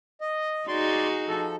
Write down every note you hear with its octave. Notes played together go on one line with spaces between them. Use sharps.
D#5
D#4 F#4 G#4 D5 C6
F3 A4